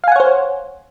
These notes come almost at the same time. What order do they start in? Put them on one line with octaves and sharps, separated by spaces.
F5 G#5 F#5 C#5 C5